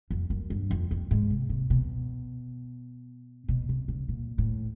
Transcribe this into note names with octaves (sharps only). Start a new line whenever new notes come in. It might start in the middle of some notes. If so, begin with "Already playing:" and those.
F2
F#2
G2
F2
F2
G#2
C3
C3
B2
B2
C3
C#3
A#2
A2